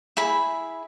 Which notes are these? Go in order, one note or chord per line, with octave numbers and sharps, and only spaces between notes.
E4 G#4 B5